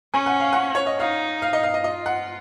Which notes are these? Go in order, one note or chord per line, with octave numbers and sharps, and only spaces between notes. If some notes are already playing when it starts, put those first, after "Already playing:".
C#4 G#5
F#5
F5
F#5
C#5
D#5
D#4 F5
F5
D#5
F5
D#5
F4 D#5
F#5